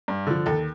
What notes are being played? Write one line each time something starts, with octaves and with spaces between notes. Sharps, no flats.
G2
D3 F3
D#2 A4